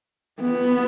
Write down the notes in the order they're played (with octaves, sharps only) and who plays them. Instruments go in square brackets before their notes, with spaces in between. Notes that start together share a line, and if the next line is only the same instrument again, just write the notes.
[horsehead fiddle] B3